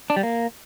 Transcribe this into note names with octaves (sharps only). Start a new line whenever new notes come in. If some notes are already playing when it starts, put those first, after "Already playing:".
D4
G3
A#3